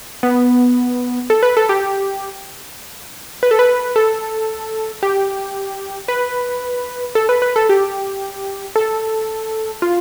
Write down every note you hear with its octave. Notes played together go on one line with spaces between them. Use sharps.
B3
A4
B4
A4
G4
B4
A4
B4
A4
G4
B4
A4
B4
B4
A4
G4
A4
F4